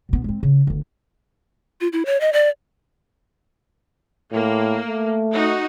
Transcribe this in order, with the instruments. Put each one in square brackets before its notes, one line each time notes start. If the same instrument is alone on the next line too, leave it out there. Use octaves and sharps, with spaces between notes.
[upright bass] B2 B3
G#3 C4
C#3
G1 D2
[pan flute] F4
E4
C#5
D#5
D5
[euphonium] A2 [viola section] A#3
[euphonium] A3
[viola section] D#4 F#4